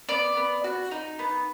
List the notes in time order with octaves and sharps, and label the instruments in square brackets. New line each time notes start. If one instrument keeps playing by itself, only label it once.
[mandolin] B3 D5
B3
F#4
D#4
B3